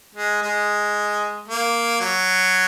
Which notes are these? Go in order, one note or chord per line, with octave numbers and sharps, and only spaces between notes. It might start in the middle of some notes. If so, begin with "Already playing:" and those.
G#3
G#3
A#3
F#3